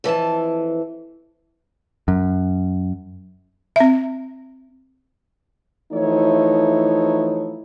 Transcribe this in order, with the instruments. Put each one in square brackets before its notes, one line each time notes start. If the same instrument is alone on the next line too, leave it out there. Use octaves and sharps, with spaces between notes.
[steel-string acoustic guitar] F2 E3 A4 A5
[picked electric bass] F#2
[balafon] C4 E5
[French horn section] E3 F3 A3 D#4 E4 C#5